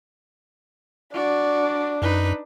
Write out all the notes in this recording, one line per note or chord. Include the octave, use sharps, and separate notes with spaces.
D4 F#4 D5
F#2 D#4 B4